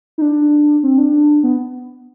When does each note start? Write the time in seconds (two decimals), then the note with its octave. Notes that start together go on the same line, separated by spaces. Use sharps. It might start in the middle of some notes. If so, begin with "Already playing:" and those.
0.18 D#4
0.22 D4
0.83 C4
0.98 D4
1.43 B3